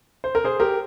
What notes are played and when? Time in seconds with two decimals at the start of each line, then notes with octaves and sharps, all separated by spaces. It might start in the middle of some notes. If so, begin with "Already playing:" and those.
0.24 C5
0.35 A#4
0.44 G#4 C5
0.60 G4 A#4